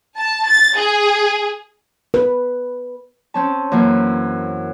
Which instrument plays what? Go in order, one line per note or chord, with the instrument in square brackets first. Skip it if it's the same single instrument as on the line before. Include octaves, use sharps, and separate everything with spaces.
[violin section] A5
A6
G#4
[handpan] B4
[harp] C4 C#4 A5
F#2 E3 A#3